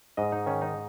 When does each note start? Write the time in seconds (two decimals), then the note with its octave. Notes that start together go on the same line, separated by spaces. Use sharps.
0.17 G#2 D#5
0.32 D#4
0.46 D#3 C#4
0.62 D#4